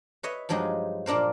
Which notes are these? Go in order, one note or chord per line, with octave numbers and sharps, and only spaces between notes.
B4 C#5 D#5 E5
G2 F3 F#3 G#3 D#4 G4
A#2 A#3 D4 A#4 C5